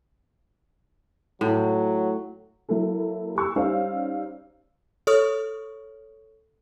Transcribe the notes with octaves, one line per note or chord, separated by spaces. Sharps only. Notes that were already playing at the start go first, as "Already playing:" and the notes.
A2 F#3
F#3 A#3 E4 A4
G4 C#6 E6
G3 C#4 D#4 C5 D5 F5
A4 C#5 C#6 D#6 F6